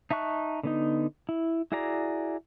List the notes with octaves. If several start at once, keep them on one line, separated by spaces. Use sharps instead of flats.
D#4 E5 A5 C#6 F#6
D3 B3 D#4
E4
E4 F#4 G#4 D5 A#5